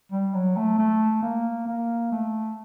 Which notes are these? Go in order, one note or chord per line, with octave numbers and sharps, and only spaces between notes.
G3
F#3
A3
A3
A#3
A#3
A3